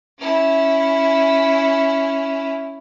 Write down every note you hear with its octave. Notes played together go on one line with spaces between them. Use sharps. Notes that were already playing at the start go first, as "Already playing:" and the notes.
C#4 E4